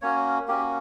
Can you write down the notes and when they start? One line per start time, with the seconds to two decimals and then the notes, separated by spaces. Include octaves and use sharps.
0.02 A#3 C#4 F#4 C#5
0.48 A#3 C#4 F#4 G4